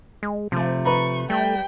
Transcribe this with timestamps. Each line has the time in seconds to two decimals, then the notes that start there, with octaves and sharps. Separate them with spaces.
0.23 G#3
0.52 C3 F3 A3
0.85 B4 A#5 B5 C#6
1.30 G3 A3 G5